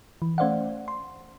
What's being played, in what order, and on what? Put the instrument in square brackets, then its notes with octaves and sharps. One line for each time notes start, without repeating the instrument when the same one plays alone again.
[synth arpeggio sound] E3
A3 C#4 C5 D5 F5 F#5
C6